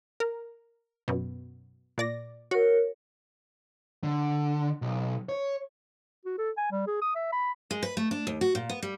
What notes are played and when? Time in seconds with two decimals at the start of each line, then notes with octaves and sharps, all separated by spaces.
0.20 A#4
1.08 F#2 B2
1.98 A#2 D5 A#6
2.51 F#4 A#4 C#5
4.03 D3
4.82 B1
5.29 C#5
6.25 F#4
6.38 A4
6.57 G#5
6.72 G3
6.87 G#4
7.01 D#6
7.15 E5
7.32 B5
7.71 G#3
7.83 B4
7.97 A3
8.11 D4
8.27 D#2
8.41 F#4
8.55 A#2
8.69 B3
8.83 G3